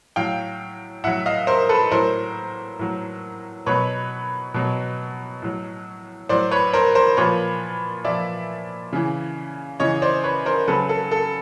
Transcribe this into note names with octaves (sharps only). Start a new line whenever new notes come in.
A2 F#3 F5 G5
A2 F#3 E5 F#5
D#5 F5
A#4 C5
A4 B4
A2 F#3 A#4 C5
A2 F#3
B2 F#3 B4 C#5
B2 F#3
A2 F#3
A2 F#3 C5 D5
B4 C#5
A#4 C5
A#4 C5
A#2 F3 B4 C#5
A#2 F3 D5 E5
C#3 E3
C#3 E3 C#5 D#5
C5 D5
B4 C#5
A#4 C5
C#3 F#3 A4 B4
A4
A4